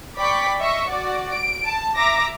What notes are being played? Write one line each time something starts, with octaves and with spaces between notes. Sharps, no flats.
D5 G5 B5 C#6 B6
D#5 E5 C#6
F#4 D5
D7
A5
E5 A#5 D6 A#6